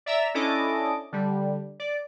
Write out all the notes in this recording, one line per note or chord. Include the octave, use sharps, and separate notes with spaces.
D5 E5 A#5 E6
C#4 D4 E4 A4 D#5 D6
D3 G3
D5